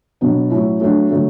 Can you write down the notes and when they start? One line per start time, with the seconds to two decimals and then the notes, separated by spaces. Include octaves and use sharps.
0.21 B2 F#3 B3 D4
0.50 A2 F#3 C#4 E4
0.80 F#3 A3 D4
1.10 D3 F#3 A3